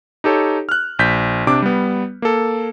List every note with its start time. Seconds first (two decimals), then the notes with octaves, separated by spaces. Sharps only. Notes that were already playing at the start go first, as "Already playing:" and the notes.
0.24 D#4 G4 A4 C#5
0.69 F6 F#6
0.99 A#1 G6 B6
1.47 C3 D4 D6
1.62 G3 B3
2.22 A#3 A4